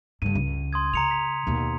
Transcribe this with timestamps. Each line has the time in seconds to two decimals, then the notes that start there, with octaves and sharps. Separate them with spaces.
0.22 G2 D3 D#7
0.35 C#2
0.73 C6 D#6 G#6
0.94 C#3 A#5 C#7 F7
1.11 B6
1.47 D#2 B2